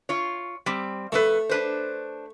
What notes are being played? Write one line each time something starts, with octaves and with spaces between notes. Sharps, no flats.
F4 C#5
G3 C4
F2 A3 A4 B4
D4 B4 C5